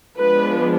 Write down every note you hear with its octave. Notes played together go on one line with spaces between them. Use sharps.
F3 G#3 B3 D4 B4